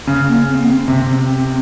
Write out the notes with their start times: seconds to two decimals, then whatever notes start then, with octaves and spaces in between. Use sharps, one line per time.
0.07 C#3
0.27 A#3
0.48 C4
0.62 A#3
0.69 C4
0.88 C3